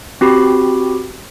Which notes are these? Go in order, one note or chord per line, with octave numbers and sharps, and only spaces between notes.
C4 F#4 G4 B5